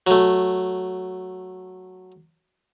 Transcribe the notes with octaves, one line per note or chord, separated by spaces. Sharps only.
F#3 A3